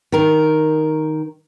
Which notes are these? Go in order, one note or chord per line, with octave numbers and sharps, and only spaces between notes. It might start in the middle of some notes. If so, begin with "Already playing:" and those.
D#3 A#4